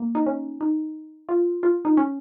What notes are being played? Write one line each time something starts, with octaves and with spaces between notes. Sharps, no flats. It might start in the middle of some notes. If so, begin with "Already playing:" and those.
Already playing: A#3
D#4
C#4
D#4
F4
F4
D#4
C#4